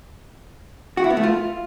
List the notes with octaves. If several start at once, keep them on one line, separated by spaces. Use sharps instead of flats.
F#4
E4
B3
A3
F4